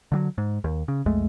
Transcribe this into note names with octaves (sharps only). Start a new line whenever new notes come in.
D3 E3 F#3
G#2
D#2
C#3
B1 F2 G#3 A3